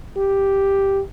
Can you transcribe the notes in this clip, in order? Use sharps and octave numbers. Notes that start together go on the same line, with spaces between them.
G4